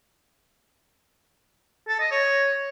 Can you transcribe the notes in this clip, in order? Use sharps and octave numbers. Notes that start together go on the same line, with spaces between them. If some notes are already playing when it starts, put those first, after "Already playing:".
A4
D#5
C#5